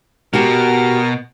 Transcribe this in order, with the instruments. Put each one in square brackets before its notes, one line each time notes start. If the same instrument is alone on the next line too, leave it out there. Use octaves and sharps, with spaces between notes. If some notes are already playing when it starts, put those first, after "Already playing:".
[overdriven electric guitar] B2 [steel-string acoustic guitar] F#4 G4 [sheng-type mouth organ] A#4 F6